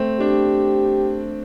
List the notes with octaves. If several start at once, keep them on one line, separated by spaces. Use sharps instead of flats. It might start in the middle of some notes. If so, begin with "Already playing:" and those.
Already playing: A3 C4
D4 G4